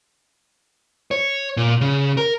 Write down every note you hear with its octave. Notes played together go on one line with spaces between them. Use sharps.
C#5
A#2
C#3
A#4